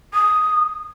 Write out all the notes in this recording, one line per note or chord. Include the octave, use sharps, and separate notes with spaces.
D#6